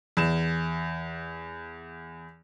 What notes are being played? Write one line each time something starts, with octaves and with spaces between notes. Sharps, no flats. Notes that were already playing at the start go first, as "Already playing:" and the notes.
E2 E7